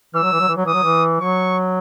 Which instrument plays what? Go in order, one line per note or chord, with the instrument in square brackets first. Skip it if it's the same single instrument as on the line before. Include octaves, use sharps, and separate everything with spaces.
[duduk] E3 [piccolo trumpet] E6
[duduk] F#3
E3
F#3
E3
F#3
[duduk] E3 [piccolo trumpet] D#6
[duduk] F#3
E3
[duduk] F#3 [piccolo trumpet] C#6